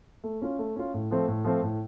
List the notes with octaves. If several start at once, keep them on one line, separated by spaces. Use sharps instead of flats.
A3
C#4 F4
A3
C#4 F4
A2
F3 A3 C4
A2
F3 A3 C4
A2